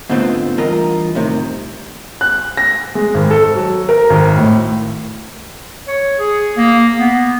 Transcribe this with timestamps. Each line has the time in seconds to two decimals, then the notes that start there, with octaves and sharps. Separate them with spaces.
0.10 G#2 D3 A3 B3 C4 F4
0.58 G2 E3 F4 A#4 D#5 A#5
1.15 A2 C3 D#3
2.21 F#6
2.57 A#6
2.95 G#3
3.14 G#1
3.31 A4
3.55 F#3
3.89 A#4
4.10 G#1
4.37 A2
5.88 C#5
6.19 G#4
6.57 A#3
6.99 B3